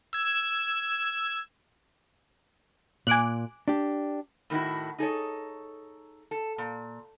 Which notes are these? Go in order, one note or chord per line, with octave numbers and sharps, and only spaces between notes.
E6 G#6
A#2 G#5 D6 F#6
D4 G4
A2 D#3 G#3 B3 E4 F#4
D#4 G#4 A4 C#5
A4
A#2